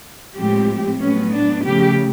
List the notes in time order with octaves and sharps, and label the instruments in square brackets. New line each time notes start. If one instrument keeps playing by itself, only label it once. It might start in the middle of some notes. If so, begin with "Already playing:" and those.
[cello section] A2 F3 G#3 C4 G4
A2 F#3 B3 C#4
D4
C#3 F3 A3 G4